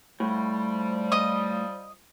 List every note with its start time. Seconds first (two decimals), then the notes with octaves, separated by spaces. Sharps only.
0.20 A2 F3 G3
1.12 D#5 D#6